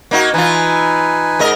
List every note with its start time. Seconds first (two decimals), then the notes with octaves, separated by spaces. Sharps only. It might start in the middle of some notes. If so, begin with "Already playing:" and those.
0.11 A#3 D#4 F#4
0.34 E3 D#4 F4 B4 G#5
1.39 G#2 A#4 D#5